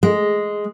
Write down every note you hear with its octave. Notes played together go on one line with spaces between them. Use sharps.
G#3